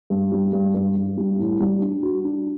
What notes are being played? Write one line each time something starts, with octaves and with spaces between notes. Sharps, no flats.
G2
G3
G2
G2
G2
G3
A2
G3
D4
F#4
D4